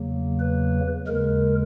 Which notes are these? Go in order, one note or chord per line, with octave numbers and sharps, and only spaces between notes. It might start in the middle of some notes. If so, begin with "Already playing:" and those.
Already playing: E2 C#3 F#3 A#3
B4
D#2 C#3 G#3 A#4